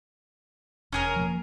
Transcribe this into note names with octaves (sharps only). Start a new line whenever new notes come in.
E1 C#4 G#4 A#4
F3 A#3